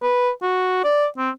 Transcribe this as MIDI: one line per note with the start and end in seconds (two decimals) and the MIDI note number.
0.02 0.30 71
0.42 0.83 66
0.84 1.06 74
1.18 1.30 60